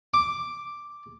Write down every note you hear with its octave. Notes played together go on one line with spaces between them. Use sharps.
D6